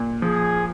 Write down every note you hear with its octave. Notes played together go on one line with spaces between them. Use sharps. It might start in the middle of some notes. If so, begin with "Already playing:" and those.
Already playing: A#2
F3 G#4